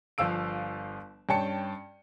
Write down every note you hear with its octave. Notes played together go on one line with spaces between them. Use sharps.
G1 F3 F5 E6 D7
G2 C#4 G5 A5 C#7